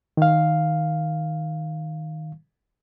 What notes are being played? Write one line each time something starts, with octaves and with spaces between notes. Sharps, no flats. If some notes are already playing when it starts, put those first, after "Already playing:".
D#3 F5